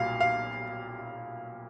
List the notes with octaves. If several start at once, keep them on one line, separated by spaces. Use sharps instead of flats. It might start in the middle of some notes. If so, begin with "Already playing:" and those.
Already playing: B1 A#2 G3 F5
F5